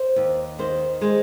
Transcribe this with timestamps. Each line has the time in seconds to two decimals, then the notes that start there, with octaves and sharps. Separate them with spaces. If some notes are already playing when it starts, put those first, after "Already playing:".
Already playing: C5
0.16 D#2
0.59 D#3 C5
1.01 G#3 C5